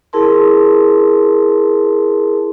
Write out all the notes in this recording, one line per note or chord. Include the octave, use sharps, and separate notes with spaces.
E4 G#4 A#4 A5 C6